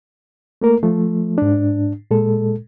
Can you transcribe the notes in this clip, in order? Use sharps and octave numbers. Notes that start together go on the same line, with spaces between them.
A3 A#3 A#4
F3 A3
G#2 D4
A#2 G#3 A4